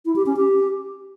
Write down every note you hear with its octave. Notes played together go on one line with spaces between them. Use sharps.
E4
G4
C#4
G4